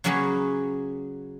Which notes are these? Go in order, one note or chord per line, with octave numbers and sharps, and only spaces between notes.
C#3 F#3 A#3 C#4 G#4 B4